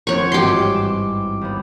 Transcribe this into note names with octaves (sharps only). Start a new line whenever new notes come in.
F1 C4 C#5 F#5 C#6
G#1 G2 E3 G4 C6
D6 E7
D#2 B3